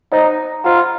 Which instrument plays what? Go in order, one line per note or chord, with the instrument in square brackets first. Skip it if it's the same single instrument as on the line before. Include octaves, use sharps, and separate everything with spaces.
[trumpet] D#4 [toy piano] C5 D#5 F#5 A#5
[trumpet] F4 [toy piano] C5 D#5 F#5 A#5